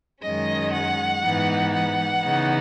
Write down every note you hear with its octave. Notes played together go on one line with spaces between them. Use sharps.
F#2 D#3 G#3 C#4 D#5
F#5
G#2 E3 B3 D#4
F#5
C#3 E3 B3 D#4